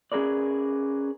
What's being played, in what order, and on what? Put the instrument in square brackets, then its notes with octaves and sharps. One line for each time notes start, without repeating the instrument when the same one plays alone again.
[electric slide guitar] C#4 G#4 A#4 B4 D5